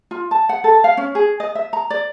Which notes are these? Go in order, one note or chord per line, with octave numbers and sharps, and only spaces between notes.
F4
A5
F#5
A4
F5
C#4
G#4
D#5
E5
A#5
D5